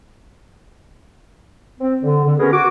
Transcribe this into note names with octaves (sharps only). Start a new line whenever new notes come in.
C4
D3
D3
B3 C#4 F#4 G#4 A#4
F#4 D6